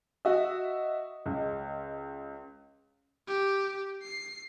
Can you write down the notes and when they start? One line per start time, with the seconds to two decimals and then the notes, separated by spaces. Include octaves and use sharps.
0.25 F#4 D#5 E5
1.26 C#2
3.28 G4
4.02 C7